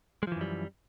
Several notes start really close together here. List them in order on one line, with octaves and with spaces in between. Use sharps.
G#3 F3 E3 F#2 G3